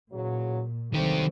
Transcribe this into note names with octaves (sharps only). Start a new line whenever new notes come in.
E2 A#2 C#3 F#3
C2 D3 D#3 F#3 A3 C4 G4